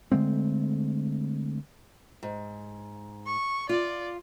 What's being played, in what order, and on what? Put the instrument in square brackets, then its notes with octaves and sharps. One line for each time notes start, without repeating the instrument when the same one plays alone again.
[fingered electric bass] D3 G#3 A3 C4
[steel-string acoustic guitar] G#2
[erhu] C#6
[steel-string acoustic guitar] F4 [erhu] D5